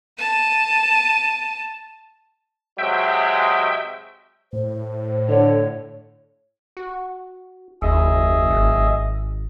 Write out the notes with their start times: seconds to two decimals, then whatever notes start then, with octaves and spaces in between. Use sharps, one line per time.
0.18 A5 D#7
2.78 C3 F#3 G#3 E5 G5
4.53 A2 C5
5.29 D3 C#5
6.77 F#4
7.82 F#1 D#2 G#4 D#5 E5
8.50 G#1